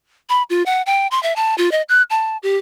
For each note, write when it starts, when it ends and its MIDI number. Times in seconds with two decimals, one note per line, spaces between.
0.29 0.43 83
0.50 0.63 65
0.66 0.82 78
0.86 1.07 79
1.11 1.21 84
1.23 1.33 76
1.36 1.55 81
1.58 1.72 65
1.72 1.82 75
1.89 2.02 90
2.10 2.37 81
2.43 2.57 67